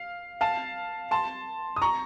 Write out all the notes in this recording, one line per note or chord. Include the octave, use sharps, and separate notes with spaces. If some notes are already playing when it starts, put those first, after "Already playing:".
Already playing: F5
F5 A5
A5 C6
D#6
A#5 C#6